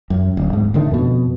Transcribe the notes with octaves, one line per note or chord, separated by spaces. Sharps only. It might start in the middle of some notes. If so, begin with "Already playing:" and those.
F#2
D1
G#2
A2 D3 D#3 A3
F2 B2